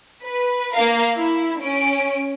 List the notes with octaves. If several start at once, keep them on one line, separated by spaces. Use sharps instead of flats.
B4
A#3 A#4 F5
E4
C#4 D7